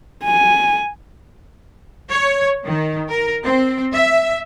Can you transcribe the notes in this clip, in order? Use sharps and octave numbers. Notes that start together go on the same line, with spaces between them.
G#5
C#5
D#3
A#4
C4
E5